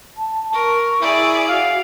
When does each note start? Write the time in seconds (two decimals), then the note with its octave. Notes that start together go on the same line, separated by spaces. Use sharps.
0.17 A5
0.53 A#4 C#6
1.02 E4 G#4 D5
1.48 F#4 F5